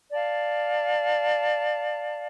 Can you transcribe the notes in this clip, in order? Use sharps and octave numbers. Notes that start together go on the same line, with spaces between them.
D5 F5 A5